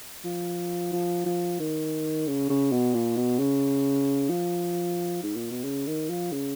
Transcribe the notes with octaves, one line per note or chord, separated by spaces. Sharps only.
F3
F3
F3
D#3
C#3
C#3
B2
A#2
B2
C#3
F3
G#2
A#2
B2
C#3
D#3
F3
C#3